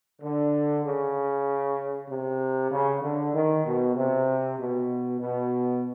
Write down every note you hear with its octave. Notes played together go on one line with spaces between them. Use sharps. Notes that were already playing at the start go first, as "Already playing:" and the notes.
D3
C#3
C3
C#3
D3
D#3
B2
C3
B2
B2